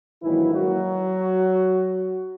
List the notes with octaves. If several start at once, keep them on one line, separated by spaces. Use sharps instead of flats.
A#1 G#2 D#3 E3 F#3 A#3 E4
F#3 F#4